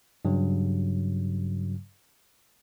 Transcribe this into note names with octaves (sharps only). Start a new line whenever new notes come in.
G2 C#3 F#3